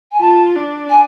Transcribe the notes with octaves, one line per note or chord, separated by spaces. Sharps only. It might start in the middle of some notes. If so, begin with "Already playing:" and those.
G#5
F4 A5
D4
G#5